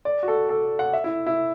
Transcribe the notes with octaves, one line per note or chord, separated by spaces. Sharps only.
D5
F#4
A4
A4
F#5
E5
E4
E4